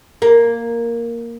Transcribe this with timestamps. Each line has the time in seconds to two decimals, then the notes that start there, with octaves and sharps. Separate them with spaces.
0.22 A#3